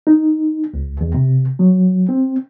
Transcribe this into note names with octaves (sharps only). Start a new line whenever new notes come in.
D#4
C#2
E2
C3
F#3
C4